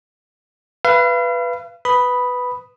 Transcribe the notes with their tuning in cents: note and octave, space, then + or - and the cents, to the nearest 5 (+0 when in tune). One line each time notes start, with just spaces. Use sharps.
B4 +0 F5 -40
B4 +5 B5 +0 D#6 +0